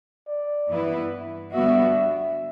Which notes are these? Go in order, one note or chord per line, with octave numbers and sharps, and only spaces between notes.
D5
G2 E3 B3 E4 B4
D3 G3 B3 F#4 E5